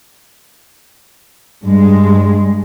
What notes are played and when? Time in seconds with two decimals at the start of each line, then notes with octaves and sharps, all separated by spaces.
1.64 G2 G#3